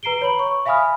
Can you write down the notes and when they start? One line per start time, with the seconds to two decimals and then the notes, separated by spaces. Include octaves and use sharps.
0.03 B4 A#5 C7 D7 G7
0.22 C#5 B5 F#7
0.39 C#6
0.66 E5 F5 G#5 B5 D#6 F6